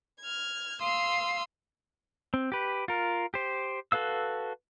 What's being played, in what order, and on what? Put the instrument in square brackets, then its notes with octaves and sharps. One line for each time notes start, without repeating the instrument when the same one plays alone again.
[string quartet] F6 G#6
F5 C6 D#6 E6
[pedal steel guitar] C4
G4 B4
F4 A#4
G4 C5
F#4 A4 B4 F5 E6